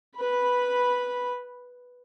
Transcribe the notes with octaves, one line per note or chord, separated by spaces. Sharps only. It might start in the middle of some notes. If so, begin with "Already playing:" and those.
B4 B5